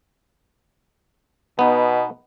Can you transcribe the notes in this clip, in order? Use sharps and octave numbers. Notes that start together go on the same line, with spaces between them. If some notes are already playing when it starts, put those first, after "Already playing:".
B2 B3 D#4